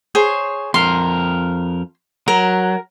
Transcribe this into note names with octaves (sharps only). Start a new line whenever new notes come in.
G#4 C5 C#5
F2 A#4 C6
F#3 A#4